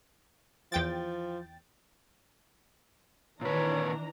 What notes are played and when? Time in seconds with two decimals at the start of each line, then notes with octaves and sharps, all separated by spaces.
0.72 E2 F3 G5 A6
3.41 A#2 D#3 E3 D4 B4 C#5 A#5